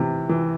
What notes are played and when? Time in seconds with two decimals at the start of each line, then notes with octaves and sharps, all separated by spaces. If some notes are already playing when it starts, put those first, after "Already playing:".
Already playing: C3 E3
0.29 E3